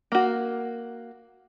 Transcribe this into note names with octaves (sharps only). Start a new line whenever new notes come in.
A#3 F#4